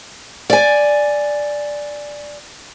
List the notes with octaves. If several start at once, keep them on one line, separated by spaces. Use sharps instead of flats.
D5 G#5